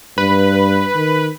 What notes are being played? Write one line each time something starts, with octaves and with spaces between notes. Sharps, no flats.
G2 B4
D#3